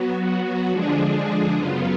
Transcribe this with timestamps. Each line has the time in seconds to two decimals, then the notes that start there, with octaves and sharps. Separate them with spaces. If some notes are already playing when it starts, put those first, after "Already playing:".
Already playing: F#3 B3 F#4
0.70 D3 F3 G#3 D4 G#4
1.55 F#2 C#3 F#3 B3 F4